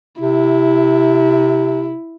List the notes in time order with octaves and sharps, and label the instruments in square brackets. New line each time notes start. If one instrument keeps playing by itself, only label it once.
[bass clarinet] C3 [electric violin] E4